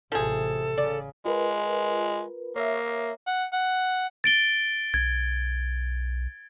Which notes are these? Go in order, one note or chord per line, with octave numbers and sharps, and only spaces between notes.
A1 C3 F3 G#4 A4
C#3 D5
G#3 F4 A#4 B4
A#3 C#5 E5
F#5
F#5
A6 D7 G7
B1 G#6